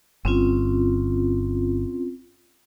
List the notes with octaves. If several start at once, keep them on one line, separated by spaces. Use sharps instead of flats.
G1 C4 C#4 F4